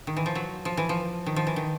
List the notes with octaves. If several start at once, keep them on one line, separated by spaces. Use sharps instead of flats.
D#3
E3
F3
F#3
F3
E3
F3
D#3
F3
E3
D#3